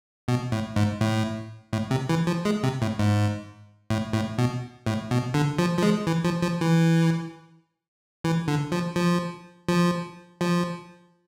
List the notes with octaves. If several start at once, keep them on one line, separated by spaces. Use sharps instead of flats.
B2
A2
G#2
A2
A2
C3
E3
F3
G#3
C3
A2
G#2
A2
A2
B2
A2
B2
D3
F3
F3
G#3
E3
F3
F3
E3
E3
D3
F3
F3
F3
F3